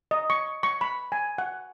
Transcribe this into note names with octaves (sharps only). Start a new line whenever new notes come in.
D#5
C#6
C#6
B5
G#5
F#5